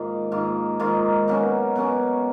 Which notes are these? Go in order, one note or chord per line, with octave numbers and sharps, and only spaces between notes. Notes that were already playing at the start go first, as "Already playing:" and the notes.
Already playing: G#2 D#3 A#3 F4
G#2 D#3 A#3 F4
G#2 D#3 A#3 F4
B2 F#3 A#3 C#4
B2 F#3 A#3 C#4